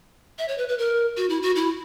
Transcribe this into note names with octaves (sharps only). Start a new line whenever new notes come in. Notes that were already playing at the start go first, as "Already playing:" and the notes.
E5
C#5
B4
B4
A#4
F#4
E4
F#4
E4